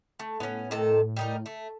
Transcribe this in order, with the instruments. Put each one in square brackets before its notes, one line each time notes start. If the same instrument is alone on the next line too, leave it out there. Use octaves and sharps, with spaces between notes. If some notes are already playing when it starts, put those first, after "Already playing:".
[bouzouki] A3
[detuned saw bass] A2 [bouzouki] B3 C#4
[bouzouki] C3 D#3 A4
G3 D#4 A#4
A3